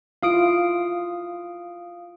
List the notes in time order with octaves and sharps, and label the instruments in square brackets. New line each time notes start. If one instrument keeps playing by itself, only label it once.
[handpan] E4 F4 [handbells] F5 D#6 D7